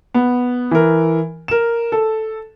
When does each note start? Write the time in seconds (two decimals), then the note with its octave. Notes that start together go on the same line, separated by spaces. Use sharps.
0.14 B3
0.71 E3 A#4
1.48 A#4 E7
1.92 A4